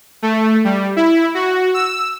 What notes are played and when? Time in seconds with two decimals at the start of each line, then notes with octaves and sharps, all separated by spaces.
0.22 A3
0.65 G3
0.96 E4
1.34 F#4
1.74 E6